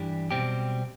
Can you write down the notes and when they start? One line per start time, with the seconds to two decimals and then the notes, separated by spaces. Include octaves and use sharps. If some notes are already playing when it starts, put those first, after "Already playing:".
Already playing: G2 E3 G3 D4 G4
0.31 B1 B2 G3 C4 G4